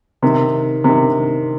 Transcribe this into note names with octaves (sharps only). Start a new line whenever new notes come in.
C3 D#3
C3 D#3